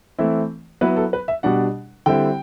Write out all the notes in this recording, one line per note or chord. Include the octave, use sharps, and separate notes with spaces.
E3 A3 C4 E4
F#3 B3 E4 B4
A4
B4
E5
B2 G3 D4 F#5
D3 G3 C4 E4 G5